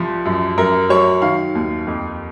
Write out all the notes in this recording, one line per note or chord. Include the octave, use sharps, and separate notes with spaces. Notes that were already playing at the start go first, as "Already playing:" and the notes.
Already playing: C2 F3
F#2
F#2 A#4
F#3 C#5
D#3 F5
D#2
F2